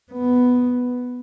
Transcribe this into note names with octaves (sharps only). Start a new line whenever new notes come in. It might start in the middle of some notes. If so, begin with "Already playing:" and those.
B3